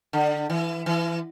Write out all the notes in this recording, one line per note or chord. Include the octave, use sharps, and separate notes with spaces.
D3
E3
E3